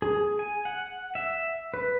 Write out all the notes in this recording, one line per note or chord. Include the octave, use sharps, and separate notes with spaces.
G#4
G#5
F#5
E5
B4